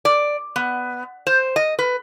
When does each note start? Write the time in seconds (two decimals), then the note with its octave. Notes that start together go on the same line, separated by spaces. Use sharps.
0.05 D5
0.56 B3
1.27 C5
1.56 D#5
1.79 B4